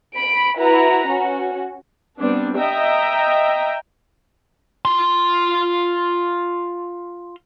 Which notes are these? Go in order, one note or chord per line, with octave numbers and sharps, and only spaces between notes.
B5 D7
E4 F#4 B4 A#5
C#4 F#4
G3 B3 C4 D4
D#5 E5 G5 A#5
F4 C6